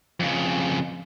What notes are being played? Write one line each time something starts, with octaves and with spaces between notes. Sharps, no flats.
F2 C#3